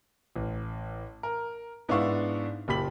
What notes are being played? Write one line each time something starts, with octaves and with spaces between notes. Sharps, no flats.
A1
A#4
G#2 B3 D4 E4 F5 C#6
F#1 A#2 G4 B5 B6 F#7